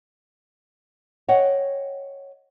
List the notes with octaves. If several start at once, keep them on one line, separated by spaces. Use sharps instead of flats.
C#5 D#5 F#5 G5